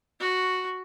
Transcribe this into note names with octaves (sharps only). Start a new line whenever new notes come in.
F#4